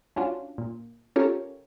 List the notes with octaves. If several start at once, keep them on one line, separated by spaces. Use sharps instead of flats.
C#4 D4 F4 F#4
A#2
C#4 F4 G4 A4 A#4 C#5